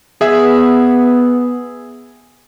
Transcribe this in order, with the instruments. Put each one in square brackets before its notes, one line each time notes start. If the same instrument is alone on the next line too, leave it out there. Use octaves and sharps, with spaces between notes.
[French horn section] B3 [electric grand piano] G#4 E5